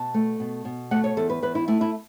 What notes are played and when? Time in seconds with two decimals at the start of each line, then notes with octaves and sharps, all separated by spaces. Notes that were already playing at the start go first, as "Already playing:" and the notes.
Already playing: B2 A5
0.14 A3
0.40 B2
0.65 B2
0.91 A3 F#5
1.04 C#5
1.17 E2 A4
1.30 B4
1.42 E2 B4
1.55 E4
1.68 A3 E4
1.81 E4